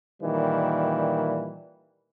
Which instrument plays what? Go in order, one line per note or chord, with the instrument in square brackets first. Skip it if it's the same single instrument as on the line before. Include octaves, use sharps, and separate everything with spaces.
[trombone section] A#2 D#3 E3 G3